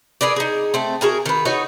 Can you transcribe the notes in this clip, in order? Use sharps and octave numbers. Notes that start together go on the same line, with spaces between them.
G#4 A#4 B4 D5
D#4 G#4
A3 C4
F#4 G#4 A#4 G#5
D#3 B4
D#4 F#4 B4 C#5